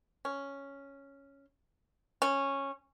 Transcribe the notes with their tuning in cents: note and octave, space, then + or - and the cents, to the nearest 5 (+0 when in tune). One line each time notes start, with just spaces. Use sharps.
C#4 +0
C#4 -10